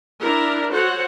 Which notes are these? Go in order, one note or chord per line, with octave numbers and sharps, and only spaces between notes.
D4 E4 A#4
F#4 A4 C5 C#5 F#5